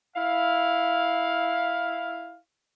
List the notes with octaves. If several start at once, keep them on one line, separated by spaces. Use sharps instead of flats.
E4 F5